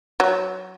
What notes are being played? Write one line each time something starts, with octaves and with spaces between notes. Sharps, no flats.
F#3